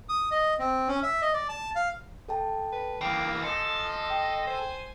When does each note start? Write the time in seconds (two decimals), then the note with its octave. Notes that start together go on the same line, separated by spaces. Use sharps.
0.09 D#6
0.31 D#5
0.59 C4
0.88 C#4
1.03 E5
1.22 D#5
1.34 D5
1.49 A5
1.76 F5
2.28 A4 G5 A5
2.72 B4
3.01 E3 A#3 G5 C7
3.43 F3 A4 D#5 G#5 C6
4.10 G5
4.47 C5 G#5